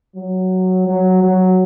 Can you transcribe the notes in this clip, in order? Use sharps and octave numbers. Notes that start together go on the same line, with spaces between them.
F#3
F#3
F#3